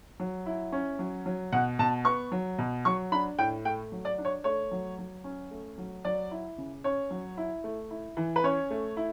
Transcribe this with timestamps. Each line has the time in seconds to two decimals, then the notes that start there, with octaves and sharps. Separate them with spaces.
0.20 F#3
0.46 E4
0.72 C#4
0.99 F#3
1.26 F#3
1.52 B2 F#5
1.79 B2 A5
2.05 B3 C#6
2.32 F#3
2.58 B2
2.85 F#3 C#6
3.12 D4 B5
3.39 A2 G5
3.65 A3 G5
3.92 F#3
4.05 D5
4.18 D4
4.25 C#5
4.44 A3 C#5
4.71 F#3
4.99 F#3
5.24 C#4
5.51 A3
5.78 F#3
6.05 F#3 D5
6.31 E4
6.58 C#3
6.84 C#4 C#5
7.11 F#3
7.37 E4
7.64 A3
7.91 E4
8.17 E3
8.36 B4
8.43 C#4 C#5
8.70 A3
8.97 E4